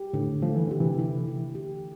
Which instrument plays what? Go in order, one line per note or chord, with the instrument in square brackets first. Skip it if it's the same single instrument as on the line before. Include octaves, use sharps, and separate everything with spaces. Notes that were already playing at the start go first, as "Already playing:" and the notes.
Already playing: [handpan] G4
[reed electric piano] A2 [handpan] D3
[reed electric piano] F3 [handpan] A3
[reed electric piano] E3
[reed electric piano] D3 [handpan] G4
[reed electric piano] C3 E3
[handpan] E4
E4
G4